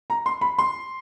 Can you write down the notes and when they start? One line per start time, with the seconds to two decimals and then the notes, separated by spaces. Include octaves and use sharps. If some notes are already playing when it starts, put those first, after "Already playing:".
0.10 A#5
0.26 C6
0.41 B5
0.59 C6